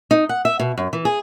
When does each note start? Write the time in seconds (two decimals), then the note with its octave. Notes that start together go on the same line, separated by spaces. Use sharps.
0.11 D#4
0.29 F#5
0.45 E5
0.59 B2
0.78 F#2
0.93 E3
1.05 G#4